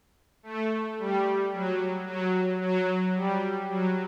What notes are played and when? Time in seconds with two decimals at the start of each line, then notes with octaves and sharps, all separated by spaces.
0.43 A3
0.99 G3
1.52 F#3
2.07 F#3
2.61 F#3
3.15 G3
3.69 F#3